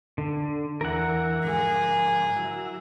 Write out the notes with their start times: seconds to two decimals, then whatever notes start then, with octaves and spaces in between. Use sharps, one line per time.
0.18 D3
0.81 E2 E3 A#4 F#5 A#5
1.44 G#2 D3 F3 G#4
2.36 F#3 E4